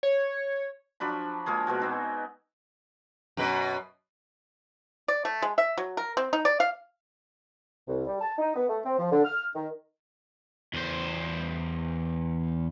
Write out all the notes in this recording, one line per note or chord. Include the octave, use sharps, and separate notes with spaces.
C#5
F3 F#3 D4 B5
F3 G#3 A#3 G#4
B2 G#3 F#4
B3 C4 D#4
F#2 B2 B4
D5
A3
G#3
E5
F#3
A#4
C4
D#4
D5
F5
C2
G3
A5
D#4
B3
A3
C4
F3
D3
F6
D#3
E2 C5